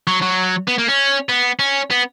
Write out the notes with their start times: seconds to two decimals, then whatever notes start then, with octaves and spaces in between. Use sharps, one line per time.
0.07 F#3
0.22 F#3
0.67 B3
0.78 A#3
0.88 C#4
1.29 B3
1.59 C#4
1.90 B3